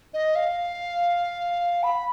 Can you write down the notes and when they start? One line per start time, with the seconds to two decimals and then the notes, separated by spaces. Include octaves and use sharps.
0.14 D#5
0.35 F5
1.83 B5